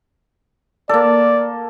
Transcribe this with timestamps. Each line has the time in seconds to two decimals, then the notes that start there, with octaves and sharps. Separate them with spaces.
0.89 A#3 A4 D5